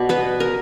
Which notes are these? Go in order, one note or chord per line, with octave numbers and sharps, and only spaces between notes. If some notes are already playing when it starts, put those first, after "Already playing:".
Already playing: B2 D5
B3 B4
A#4